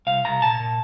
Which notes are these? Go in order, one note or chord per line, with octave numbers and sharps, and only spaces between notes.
C2 F5
C2 A#5
A#2 A5
A#2